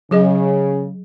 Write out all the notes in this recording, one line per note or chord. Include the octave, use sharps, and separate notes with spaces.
C#3 F#3 G#4 D#5